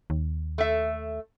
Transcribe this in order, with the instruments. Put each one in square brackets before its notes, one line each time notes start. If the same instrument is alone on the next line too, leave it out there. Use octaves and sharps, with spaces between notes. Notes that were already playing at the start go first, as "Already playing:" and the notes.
[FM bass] D#2
[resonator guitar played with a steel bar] A3 E5